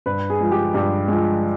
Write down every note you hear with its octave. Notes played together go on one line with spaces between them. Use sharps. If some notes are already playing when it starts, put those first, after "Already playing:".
G2 B4
G#4
F3 G#3
G4
G2 G4
F3 G#3